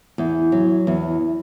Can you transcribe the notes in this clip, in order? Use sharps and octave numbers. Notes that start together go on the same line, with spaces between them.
E2
F#3
E2